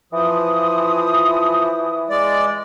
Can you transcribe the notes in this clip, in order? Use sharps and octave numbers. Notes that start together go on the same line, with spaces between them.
E3 F3 D#6
G#3 D5